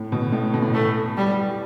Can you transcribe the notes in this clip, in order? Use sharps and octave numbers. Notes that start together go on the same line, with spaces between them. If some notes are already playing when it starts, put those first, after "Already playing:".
Already playing: A2
B2
A2
B2
A2
B2 A3
G3